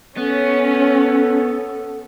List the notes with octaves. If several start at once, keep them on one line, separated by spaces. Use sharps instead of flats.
B3 C#4 A4